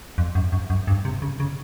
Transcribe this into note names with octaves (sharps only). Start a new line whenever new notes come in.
F2
F#2
F#2
F#2
G2
C3
C#3
C#3